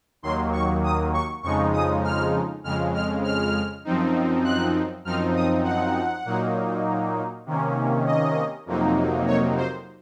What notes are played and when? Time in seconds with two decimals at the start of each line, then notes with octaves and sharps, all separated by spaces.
0.23 D#2 D#3 F#3 A#3 C6
0.52 C#6
0.84 D#6
1.13 C#6
1.43 F2 C#3 F3 G#3 D#4 C#6
1.73 D#6
2.04 F6
2.64 F2 C#3 G#3 F6
2.95 F6
3.24 F6
3.84 F#2 F3 C4 D#4
4.44 F#6
5.05 F#2 F3 C4 D#4 F6
5.36 D#6
5.64 F#5
6.25 A#2 F#3 A#3 D#4
7.46 C3 D#3 A#3 C#4
8.06 D#5
8.66 F2 C3 F#3 A#3 D#4
9.27 C#5
9.57 C5